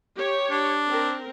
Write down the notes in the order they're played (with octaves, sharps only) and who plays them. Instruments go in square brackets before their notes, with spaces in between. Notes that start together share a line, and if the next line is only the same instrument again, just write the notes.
[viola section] G4 C#5
[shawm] D4
[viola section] C4 A#4